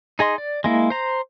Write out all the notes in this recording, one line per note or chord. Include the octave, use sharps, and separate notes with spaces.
D#4 G#4 D#5 C6
D5
G#3 A#3 E4
C5 A#5